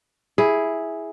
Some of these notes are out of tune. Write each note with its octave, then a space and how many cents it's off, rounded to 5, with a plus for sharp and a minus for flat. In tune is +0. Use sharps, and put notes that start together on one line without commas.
E4 -5 G#4 +0